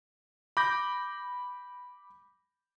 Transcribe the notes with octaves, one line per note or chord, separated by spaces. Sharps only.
B5 D6 G6 A#6